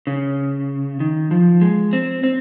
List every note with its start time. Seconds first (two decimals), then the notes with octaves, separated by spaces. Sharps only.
0.07 C#3
1.00 D#3
1.31 F3
1.61 G#3
1.93 C4
2.24 C4